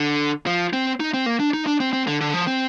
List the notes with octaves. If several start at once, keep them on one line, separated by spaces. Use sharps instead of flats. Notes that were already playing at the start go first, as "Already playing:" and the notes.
Already playing: D3
F3
C4
D#4
C4
A#3
D4
D#4
D4
C4
C4
D3
D3
F3
C4